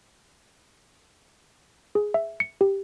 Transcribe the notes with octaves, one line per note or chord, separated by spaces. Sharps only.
G#4
E5
C#7
G4